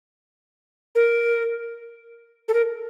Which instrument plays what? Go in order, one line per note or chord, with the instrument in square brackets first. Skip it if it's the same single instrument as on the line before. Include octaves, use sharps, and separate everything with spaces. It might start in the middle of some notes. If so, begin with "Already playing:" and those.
[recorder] A#4
A4
A#4